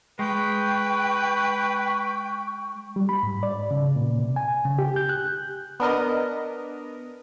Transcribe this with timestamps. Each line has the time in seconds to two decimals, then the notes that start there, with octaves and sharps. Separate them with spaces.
0.19 G#3 B4 G5 C#6
2.96 G3
3.09 B5
3.23 G#2
3.43 D5
3.71 C#3
3.96 A#2
4.18 C3
4.36 G#5
4.65 C#3
4.79 G4
4.96 G6
5.09 F#6
5.80 B3 D4 A#4 D#5